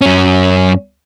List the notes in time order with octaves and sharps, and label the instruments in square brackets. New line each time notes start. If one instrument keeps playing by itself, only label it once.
[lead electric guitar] F#2 C#4